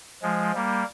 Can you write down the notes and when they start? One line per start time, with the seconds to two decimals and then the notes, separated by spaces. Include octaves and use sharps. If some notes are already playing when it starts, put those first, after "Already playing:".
0.22 F3 G#3
0.54 G3 A#3